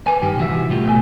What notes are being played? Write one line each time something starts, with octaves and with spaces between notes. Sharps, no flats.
B4 G#5
G2 D#3 G4
C3 E3 F#4 E5
C2 A2 F4 G4
B2 A3 D#5 G#5